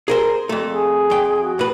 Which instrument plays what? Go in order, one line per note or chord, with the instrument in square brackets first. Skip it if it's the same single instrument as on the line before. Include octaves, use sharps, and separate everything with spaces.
[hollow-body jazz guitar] G#4 A#4 C5
F2 A3
[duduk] G#4
[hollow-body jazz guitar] F2 G5
[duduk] F#4
[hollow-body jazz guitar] A2 B4